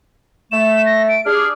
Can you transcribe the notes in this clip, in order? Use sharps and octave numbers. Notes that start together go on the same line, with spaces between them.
A3 E7
A#6
D7
D4 G4 G#4 F6